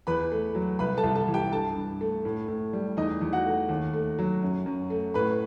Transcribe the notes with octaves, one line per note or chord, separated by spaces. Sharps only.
E2 B4 B5
A3
F#3
C2 B4 B5
A4 A5
C2
A4 A5
E3
G4 G5
G2 A4 A5
G2
A3
A2
A2
G3
E2 D#4 D#5
E2
F#4 F#5
A3
D#2
A3
F#3
F#2
F#2
A3
A2 B4 B5